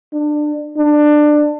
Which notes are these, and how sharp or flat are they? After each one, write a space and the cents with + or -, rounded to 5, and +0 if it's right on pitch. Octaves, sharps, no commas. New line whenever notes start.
D4 +25
D4 +20